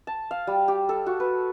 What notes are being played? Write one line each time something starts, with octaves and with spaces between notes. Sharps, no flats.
A5
F5
G3
G4
A4
F#4
B4